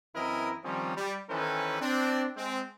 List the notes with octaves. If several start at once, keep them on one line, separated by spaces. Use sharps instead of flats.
F#2 E3 C4 E4 A#4 D#5
D#3 F3 G3 C4 C#4
G3
D#3 E3 C#4 A4 B4 C5
C4 D4
G#3 C4